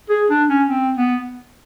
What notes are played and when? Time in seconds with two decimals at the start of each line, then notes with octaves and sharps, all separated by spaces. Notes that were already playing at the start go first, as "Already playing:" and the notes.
0.09 G#4
0.30 D4
0.49 C#4
0.68 C4
0.97 B3